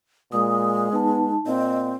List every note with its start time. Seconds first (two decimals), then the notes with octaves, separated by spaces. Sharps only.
0.32 A#2 G#3 D#6
0.92 B3 D#4 A5
1.46 A#2 C4 D#5